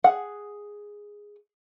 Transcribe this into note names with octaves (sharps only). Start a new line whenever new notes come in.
G#4 F#5